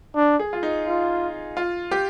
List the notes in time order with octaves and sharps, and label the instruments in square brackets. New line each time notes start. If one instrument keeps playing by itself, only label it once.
[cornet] D4
[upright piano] G#4
F4
D#4
[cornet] F4
[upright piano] F4
G4